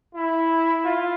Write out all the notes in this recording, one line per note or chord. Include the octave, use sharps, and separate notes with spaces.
E4
F4